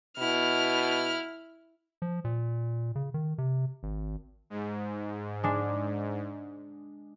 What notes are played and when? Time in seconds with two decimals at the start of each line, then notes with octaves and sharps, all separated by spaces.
0.19 B2 E4 F6
2.02 F3
2.24 A#2
2.95 C#3
3.14 D#3
3.38 C3
3.83 G#1
4.50 G#2
5.44 G#3 D4